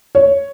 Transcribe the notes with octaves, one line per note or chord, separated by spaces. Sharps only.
C#5